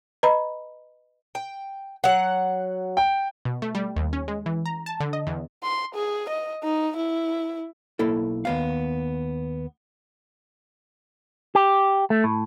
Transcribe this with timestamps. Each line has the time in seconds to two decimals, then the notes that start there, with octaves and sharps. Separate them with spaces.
0.23 B4 D#5 A#5 B5
1.35 G5
2.04 F#3 F#5
2.97 G5
3.45 B2
3.62 A3
3.75 G3
3.96 D#2
4.13 C#4
4.28 G#3
4.46 E3
4.66 A#5
4.86 A5
5.00 D3
5.13 D#5
5.27 E2
5.63 C6
5.95 G#4
6.30 D#5
6.63 D#4
6.97 E4
7.99 B1 A#3 E4 A4
8.45 D#2 B3 F5
11.55 G4
12.10 A3
12.24 A2